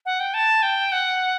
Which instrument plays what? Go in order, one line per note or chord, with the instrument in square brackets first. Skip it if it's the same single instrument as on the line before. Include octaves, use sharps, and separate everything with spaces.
[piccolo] F#5
G5
A5
G5
F#5